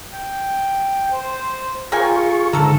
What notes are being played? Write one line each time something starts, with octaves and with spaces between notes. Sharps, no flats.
G5
C5
F4 G#4 A#4 G5 G#5 C#6
G#2 D3 A4 A#4 E6